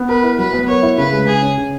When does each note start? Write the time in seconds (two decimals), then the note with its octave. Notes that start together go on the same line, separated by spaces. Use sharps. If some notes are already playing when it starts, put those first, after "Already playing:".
Already playing: B3
0.09 A#4 B4
0.23 E4
0.38 F#3 B4
0.53 B3
0.68 A#4 C#5
0.83 E4
0.98 C#3 B4
1.13 G#3
1.27 C#3 G#4
1.42 C#4
1.57 C#3